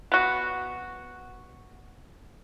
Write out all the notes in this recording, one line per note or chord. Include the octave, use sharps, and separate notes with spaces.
B3 F#4